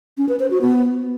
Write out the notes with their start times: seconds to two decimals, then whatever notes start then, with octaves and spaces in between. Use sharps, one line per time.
0.18 C#4
0.29 B4
0.40 C5
0.51 F#4
0.62 B3